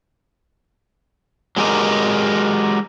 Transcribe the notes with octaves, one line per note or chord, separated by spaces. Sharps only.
F#3 G#3 G4 A#4 D#5